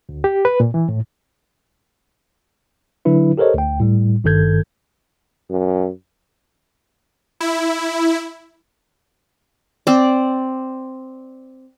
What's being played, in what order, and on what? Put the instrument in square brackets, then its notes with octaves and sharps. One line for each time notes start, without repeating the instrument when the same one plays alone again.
[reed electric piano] D2
G4
B4
A#2
E3
A2
[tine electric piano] D3 F#3 D4 E4 B4
G4 A4 A#4 C5 C#5 D#5
D2 G5
A2 G3
G#1 G2 D#3 A4 G6 G#6
[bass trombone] F#2
[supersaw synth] E4
[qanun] C4 D5